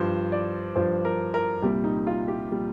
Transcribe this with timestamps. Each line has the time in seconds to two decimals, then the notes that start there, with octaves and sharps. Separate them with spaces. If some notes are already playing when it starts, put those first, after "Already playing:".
Already playing: G2 F3 C5
0.32 D5
0.75 G2 F3 C5
1.05 A#4
1.34 A#4
1.62 C2 A#2 G3 G4
1.84 D#4
2.07 F4
2.28 G4
2.51 A#2 G3